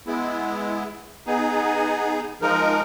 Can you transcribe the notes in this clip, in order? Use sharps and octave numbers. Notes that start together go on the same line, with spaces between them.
G#3 B3 E4
B3 D#4 G#4
F3 G#3 D#4 A#4